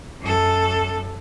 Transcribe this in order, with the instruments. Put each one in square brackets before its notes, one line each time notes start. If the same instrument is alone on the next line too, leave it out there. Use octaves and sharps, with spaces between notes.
[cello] F#2 A4